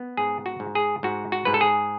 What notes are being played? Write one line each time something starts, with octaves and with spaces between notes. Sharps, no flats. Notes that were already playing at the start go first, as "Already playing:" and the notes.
Already playing: B3
G#2 G#4
F#4
G#2
G#4
G#2 F#4
F#4
G#2 B4
A4
G#4